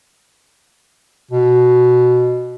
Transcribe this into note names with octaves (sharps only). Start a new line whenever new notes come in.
B2